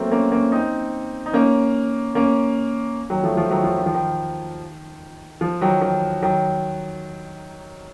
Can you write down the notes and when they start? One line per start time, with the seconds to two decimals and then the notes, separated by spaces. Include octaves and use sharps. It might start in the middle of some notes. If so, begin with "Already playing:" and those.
Already playing: F#3 A3 A#3 C4
0.11 A#3 C#4
0.32 A#3 C#4
0.52 C4 D#4
1.26 D#4
1.33 A#3 C#4
2.15 A#3 C#4
3.10 D#3 F#3
3.24 F3 A3
3.37 F3 A3
3.51 D#3 F#3
3.64 F3
3.78 D#3
3.86 F3
3.94 D#3
5.41 F3
5.61 D#3 F#3
5.81 D#3
6.22 D#3 F#3